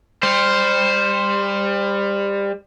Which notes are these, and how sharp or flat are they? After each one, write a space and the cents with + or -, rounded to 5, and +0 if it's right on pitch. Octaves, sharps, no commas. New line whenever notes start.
G3 +25 C5 +0